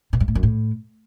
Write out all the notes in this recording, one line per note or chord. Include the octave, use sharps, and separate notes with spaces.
B2
G2
A2
F#2
A2